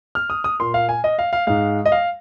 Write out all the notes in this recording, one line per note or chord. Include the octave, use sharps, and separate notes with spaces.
F6
D#6
D#6
A#2 A#3 C6
F5
G#5
D#5
F5
F5
G#2 G#3 F5
D#5
F5